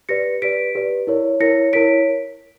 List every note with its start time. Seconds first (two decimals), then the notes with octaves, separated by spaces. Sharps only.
0.09 G4 B4 D5 A#6 C#7
0.42 G4 B4 D5 B6 D7
0.75 G4 B4 D5
1.07 E4 A#4 C#5
1.40 E4 A#4 C#5 A#6 C#7
1.73 E4 A#4 C#5 B6 D7